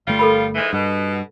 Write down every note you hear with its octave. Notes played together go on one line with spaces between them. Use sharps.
G1 G3 A3 F4
A4 A#4 B5
G#2 E3 G#3
G2 B2